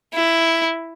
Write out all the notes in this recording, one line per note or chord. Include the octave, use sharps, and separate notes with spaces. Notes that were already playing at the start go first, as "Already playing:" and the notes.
E4